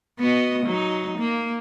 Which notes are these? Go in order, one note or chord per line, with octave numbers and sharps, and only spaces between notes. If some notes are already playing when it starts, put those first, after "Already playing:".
B3 F#4 D#5
F#3 D#4
A#3